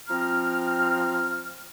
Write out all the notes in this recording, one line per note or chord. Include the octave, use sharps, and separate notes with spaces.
F3 C4 A#5 F6